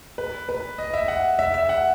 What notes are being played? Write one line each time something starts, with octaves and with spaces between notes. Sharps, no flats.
B4
B4
D#5
E5
F#5
E5
E5
F#5